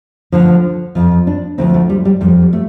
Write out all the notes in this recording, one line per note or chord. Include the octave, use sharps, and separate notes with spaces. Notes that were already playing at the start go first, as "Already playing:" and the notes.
D2 D3 F3
F2 F3 F4
D4
D2 D3 F3 C4
A3
G3
G3
F2 F3 G3
G3
A3